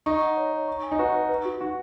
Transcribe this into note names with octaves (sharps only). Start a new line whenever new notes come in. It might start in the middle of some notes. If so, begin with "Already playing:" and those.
D#4 C#6
F#5
C#5
C#5
C#6
G#5
D#4
F#4 B4
B4
B4
F#4
D#4 F#4